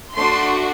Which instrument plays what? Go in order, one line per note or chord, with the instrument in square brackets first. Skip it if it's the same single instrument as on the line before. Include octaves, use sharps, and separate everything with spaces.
[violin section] A3 D4 F#4 C6